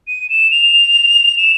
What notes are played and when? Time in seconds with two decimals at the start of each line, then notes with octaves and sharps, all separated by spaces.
0.07 D#7
0.30 E7
0.51 F7
1.38 E7